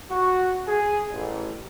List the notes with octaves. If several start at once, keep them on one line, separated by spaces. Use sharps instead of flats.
F#4
G#4
A1